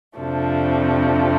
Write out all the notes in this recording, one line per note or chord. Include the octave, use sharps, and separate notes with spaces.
F2 C3 F3 A3 D4